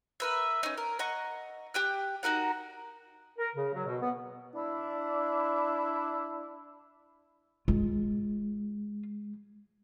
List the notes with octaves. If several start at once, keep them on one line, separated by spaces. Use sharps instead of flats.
A#4 B4 E5
C#4 D#4
A#4
D#5 F#5 A#5 C#6
G4 G5 F#6
D#4 F#4 A#4 F#5
A#4
C#3
F#3
B2
B3
D4 E4
G#3 F4